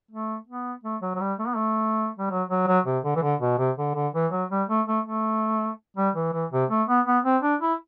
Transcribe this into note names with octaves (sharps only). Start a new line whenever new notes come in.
A3
B3
A3
F#3
F#3
G3
A3
B3
A3
G3
F#3
F#3
F#3
C3
D3
E3
D3
B2
C3
D3
D3
E3
F#3
G3
A3
A3
A3
G3
E3
E3
C3
A3
B3
B3
C4
D4
E4